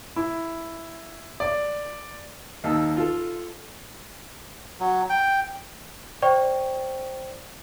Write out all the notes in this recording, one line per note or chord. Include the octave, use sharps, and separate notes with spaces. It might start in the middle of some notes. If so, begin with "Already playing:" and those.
E4
D5
D#2 D#4 A5 E6
F4 A4
F#3
G5
C5 D5 G5 C#6